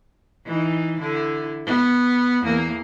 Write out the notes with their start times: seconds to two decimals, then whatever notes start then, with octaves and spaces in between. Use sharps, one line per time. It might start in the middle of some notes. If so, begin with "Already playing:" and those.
0.46 E3 D#4
1.00 D3 E4
1.66 B3
2.41 E2 A#3